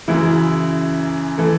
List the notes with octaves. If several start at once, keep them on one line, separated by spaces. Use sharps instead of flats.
F#2 C#3 E3 E4
E3 A4